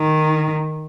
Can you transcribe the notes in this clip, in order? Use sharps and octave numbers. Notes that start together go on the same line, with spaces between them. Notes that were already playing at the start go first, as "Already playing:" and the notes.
Already playing: D#3